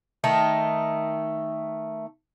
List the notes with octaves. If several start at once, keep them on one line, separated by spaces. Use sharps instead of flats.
D#3 A3 D#4